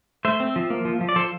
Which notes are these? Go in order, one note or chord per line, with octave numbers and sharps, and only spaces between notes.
A3 C5 E5
C4
F3
A#3
F3
F3
D5
F3 A4 C5